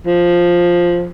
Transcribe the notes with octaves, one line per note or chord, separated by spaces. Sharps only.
F3